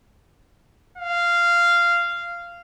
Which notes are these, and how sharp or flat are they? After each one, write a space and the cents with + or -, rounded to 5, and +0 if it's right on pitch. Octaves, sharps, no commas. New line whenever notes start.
F5 -10